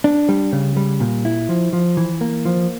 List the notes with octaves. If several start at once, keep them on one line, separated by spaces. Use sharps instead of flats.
D4
G3
C#3
G3
A#2
E4
F3
F3
E3
A#3
F3